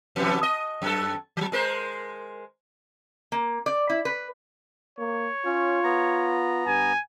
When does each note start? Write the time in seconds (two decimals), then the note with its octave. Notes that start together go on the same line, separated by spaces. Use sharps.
0.16 F2 C3 E3
0.43 D#5
0.82 F#2 A4
1.37 F3 F#3
1.52 G#3 A#4 C5
3.32 A#3
3.66 D5
3.90 E4
4.05 B4
4.99 A#3 C#5
5.45 C#4 F4
5.84 B3 A#5
6.67 G2 G#5